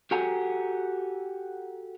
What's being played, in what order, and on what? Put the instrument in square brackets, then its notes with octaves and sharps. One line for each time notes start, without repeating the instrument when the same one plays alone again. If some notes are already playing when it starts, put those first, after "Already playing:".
[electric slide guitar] F#4 G4 A4 F#5 G#5 A#5